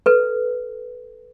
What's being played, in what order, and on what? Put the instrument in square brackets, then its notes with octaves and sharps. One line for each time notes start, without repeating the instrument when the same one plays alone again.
[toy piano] A4 B4